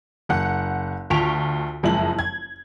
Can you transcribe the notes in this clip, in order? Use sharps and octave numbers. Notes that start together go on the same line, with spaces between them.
F#1 F#5 F#6
D2 F4 C#6 B6 D7 F7
F#1 F2 G#3 E4 F#7
G#6